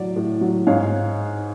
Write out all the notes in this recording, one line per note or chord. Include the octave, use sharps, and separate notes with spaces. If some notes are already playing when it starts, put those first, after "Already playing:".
Already playing: A2 F#3 D5
A2
F#3
G#2 C#5 F5